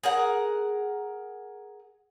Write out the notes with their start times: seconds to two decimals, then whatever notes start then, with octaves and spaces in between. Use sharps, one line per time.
0.03 G#4 A#4 F#5